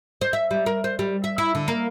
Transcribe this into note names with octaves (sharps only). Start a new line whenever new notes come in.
C5
E5
G3
A#4
C5
G3
E5
E4
D3
A#3